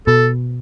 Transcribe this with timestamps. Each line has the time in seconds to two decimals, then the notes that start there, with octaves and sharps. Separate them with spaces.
0.07 B2 A4